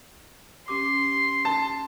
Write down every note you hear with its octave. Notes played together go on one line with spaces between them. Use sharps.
C#4 G4 C6 D6
A5